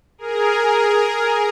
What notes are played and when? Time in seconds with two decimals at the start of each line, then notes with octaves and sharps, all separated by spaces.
0.18 G#4 A#4